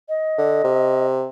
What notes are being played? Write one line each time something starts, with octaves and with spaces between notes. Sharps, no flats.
D#5
D3
C3